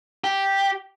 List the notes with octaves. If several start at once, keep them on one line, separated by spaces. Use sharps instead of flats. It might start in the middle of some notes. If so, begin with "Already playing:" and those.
G4